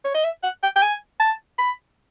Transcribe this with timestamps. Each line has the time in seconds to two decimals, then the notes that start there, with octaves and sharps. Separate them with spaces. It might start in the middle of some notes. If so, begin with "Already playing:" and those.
0.04 C#5
0.14 D#5
0.24 E5
0.43 F#5
0.63 G5
0.76 G5
0.82 G#5
1.20 A5
1.59 B5